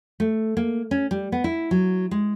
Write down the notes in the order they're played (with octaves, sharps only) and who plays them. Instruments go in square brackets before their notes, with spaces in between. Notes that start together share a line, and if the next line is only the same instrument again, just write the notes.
[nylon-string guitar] A3
A#3
C#4
G3
B3
E4
F#3
G#3